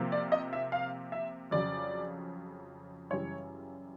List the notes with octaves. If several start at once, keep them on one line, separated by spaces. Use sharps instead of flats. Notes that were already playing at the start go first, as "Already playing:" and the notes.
Already playing: C3 F3 A#3
D5
D#5
E5
F5
E5
F2 C#3 F#3 D5
F#2 C#3 E3 G3 C#5